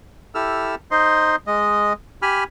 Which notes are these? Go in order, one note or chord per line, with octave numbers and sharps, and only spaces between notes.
E4 G4 A4 E6 F6
D#4 C5 D#5 C6
G#3 D#5
G4 G#5 B5 F6